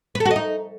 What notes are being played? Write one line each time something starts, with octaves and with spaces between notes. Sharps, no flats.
B4
A4
F#4
D#5
D#4